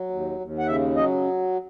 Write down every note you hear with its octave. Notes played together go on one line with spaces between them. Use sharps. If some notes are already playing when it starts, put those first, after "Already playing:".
Already playing: F#3
D#2
D#2
F#5
C#3 E5
F#3 D#5